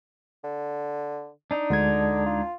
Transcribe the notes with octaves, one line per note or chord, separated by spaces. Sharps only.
D3
D4 D#4
D2 D3 G#3 G#6
F4